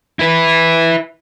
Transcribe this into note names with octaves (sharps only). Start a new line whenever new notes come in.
E4 B4